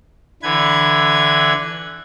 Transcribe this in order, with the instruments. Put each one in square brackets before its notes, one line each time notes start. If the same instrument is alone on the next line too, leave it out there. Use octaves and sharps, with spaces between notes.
[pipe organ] D3 E3 B4 G#6